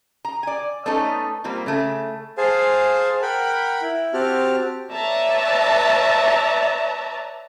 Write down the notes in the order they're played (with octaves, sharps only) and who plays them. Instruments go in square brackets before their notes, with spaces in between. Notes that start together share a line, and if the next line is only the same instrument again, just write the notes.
[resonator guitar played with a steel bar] A#5
D5 G#5
A3 B3 C#4 D#4 A4 C#5
G3 A#3 C4 F4
C#3 A3
[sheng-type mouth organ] G#4 C5 F5 G#5 A5
A#4 F#5 G5 B5
E4
C4 F#4 G4 A5 F6
[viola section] B4 C#5 D5 E5 A5 A#5